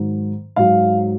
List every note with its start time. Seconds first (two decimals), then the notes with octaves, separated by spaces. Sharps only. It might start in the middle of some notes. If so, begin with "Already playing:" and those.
Already playing: G#2 D#3 F#3
0.56 G#2 F#3 F5